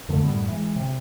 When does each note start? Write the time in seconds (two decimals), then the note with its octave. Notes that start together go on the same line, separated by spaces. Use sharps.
0.09 F2 D3 A3
0.23 F#2 A2 G3 B3
0.48 E3 G#3
0.76 C3